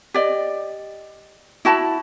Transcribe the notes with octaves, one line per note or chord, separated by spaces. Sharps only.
G4 D5 D#5
E4 F#4 A5 B5